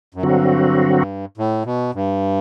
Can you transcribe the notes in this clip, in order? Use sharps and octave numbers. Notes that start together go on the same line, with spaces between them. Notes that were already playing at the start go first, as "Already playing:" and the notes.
F#2
G2 D3 F#3 C4 F#4
A2
B2
G2